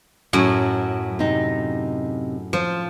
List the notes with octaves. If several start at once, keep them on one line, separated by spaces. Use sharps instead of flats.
F#2 A2 F#3
C3 D#4
F3 C5